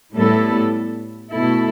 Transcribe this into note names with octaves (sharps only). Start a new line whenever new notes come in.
A2 G3 B3 E4 A4
B2 A3 E4 A4